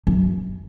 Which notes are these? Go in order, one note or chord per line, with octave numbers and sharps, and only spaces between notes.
F#2